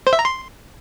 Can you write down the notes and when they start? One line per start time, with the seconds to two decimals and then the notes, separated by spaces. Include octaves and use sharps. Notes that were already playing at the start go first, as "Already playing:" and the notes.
0.07 C5
0.13 E5
0.19 A#5
0.25 C6